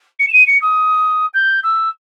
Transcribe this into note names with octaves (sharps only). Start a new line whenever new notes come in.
C#7
E7
D#7
C#7
D#6
G6
E6